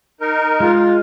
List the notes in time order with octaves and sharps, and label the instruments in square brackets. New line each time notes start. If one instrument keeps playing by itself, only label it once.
[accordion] D#4 A#4
[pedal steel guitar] G#3 [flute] F4